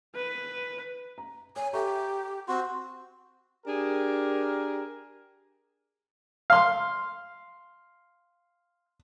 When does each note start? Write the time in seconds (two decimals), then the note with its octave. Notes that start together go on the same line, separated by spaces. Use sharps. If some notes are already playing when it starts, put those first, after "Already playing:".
0.15 B4
1.18 A#5
1.56 C#5 G#5
1.73 G4 A4 E5 A#5 C#6
2.48 C4 F#4 C6
3.66 D4 G4 G#4 A#4
6.50 F5 C6